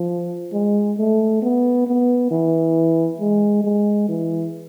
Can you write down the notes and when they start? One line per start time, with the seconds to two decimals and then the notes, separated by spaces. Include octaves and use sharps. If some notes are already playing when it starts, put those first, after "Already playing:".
Already playing: F3
0.53 G#3
0.98 A3
1.42 B3
1.87 B3
2.31 E3
3.20 G#3
3.64 G#3
4.08 E3